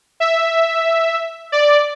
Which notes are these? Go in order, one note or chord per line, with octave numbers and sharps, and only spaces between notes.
E5
D5